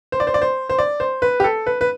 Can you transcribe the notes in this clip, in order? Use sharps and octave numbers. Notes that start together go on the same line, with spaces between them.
C5
D5
C5
D5
C5
C5
D5
C5
B4
G4
A4
B4
B4